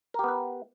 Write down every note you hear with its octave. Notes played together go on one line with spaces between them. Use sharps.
B3 G4 A#4 B4